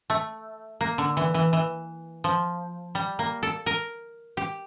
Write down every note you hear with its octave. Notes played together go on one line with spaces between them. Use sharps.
A3
A#3
D3
E3
E3
E3
F3
G3
A#3
A4
A#4
G4